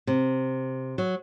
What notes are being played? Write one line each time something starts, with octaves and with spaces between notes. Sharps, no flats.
C3
F#3